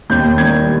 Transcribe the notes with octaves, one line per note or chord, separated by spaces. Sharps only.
D#2 G6
D#3 G3 G#6